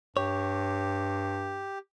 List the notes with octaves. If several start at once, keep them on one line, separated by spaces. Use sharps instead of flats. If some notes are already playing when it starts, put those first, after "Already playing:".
G2 G4 C#5